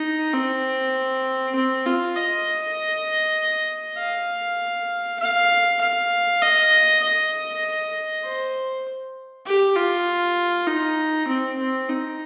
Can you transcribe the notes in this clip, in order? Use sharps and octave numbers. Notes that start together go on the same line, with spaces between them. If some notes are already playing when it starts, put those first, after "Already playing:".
Already playing: D#4
C4
C4
F4
D#5
F5
F5
F5
D#5
D#5
C5
G4
F4
D#4
C4
C4
D#4